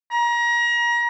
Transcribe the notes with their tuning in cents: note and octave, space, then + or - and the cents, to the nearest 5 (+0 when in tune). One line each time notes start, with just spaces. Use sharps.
A#5 +30